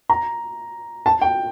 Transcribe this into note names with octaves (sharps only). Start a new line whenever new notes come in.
A#5
A5
G5